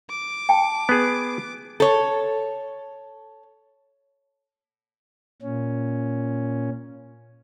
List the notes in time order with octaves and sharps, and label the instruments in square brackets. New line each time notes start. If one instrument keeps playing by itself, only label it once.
[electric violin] D6
[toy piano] G5 A5
[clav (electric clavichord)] B3 G#4
[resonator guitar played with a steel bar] A4 C#5
[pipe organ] A#2 C#4